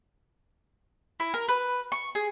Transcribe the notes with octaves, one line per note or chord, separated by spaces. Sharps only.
E4
A#4
B4
C#6
G#4